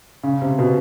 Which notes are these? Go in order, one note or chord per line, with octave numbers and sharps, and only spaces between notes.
C#3
C3
B2